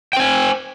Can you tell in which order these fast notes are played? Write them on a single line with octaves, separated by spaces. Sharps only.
G5 C5 G#5